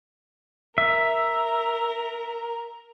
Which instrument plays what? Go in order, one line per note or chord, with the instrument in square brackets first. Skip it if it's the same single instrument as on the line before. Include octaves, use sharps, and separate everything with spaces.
[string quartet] A#4 [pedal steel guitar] E5